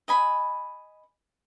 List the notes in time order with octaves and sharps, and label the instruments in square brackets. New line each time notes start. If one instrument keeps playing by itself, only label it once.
[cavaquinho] D#5 G#5 B5